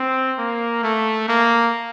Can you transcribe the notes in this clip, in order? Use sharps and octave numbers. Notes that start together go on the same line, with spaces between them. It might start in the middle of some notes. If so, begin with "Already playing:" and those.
Already playing: C4
A#3
A3
A#3